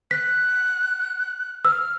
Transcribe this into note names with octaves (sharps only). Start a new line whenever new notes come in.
F#6 B6
E6 F6